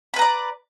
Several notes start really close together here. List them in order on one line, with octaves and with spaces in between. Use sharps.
B5 B4 A#5 D5